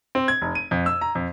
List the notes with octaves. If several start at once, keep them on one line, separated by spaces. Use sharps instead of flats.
C4
G#6
F1
D#7
F2
E6
A#5
F2